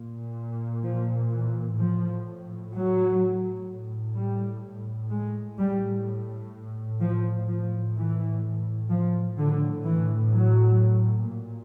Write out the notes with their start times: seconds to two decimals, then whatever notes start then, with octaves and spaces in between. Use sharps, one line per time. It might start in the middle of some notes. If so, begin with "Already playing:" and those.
Already playing: A#2
0.83 F3
1.31 E3
1.77 A2 F3
2.73 F#3
3.67 A2
4.15 G3
5.10 G#3
5.58 A2 G3
7.00 F3
7.47 A2 F3
7.96 E3
8.90 F3
9.37 A2 D3
9.85 E3
10.33 F#3
11.27 A#2